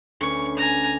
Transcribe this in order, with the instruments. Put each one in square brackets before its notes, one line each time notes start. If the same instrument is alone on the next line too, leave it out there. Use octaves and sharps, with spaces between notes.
[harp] D2 C#4 B4 [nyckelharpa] C#6
[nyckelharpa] G#5 A#5